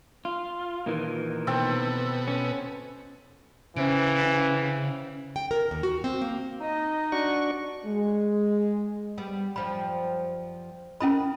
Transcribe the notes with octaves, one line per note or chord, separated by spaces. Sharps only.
F4
A#2 D#3 E3
B2 C4 A4 G5
C#4
C#3 E3 C#4 C5 D7
G5
A#4
D#2
F#4
C4
A#3
D#4 D#5
D4 F#4 C#6
G#3
G3 B3
F#2 F3 G3 B5
C#4 E4 A#4 B4 D#5 B5